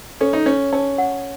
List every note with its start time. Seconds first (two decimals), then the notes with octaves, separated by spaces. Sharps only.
0.21 C#4 A4
0.33 D#4
0.46 C#4 C#5
0.72 C#4 A5
0.98 F#5